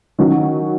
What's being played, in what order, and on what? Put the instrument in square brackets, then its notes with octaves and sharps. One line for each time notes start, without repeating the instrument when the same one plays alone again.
[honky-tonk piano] D#3 F#3 C#4 F#4